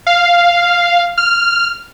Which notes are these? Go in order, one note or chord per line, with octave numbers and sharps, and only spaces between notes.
F5
F6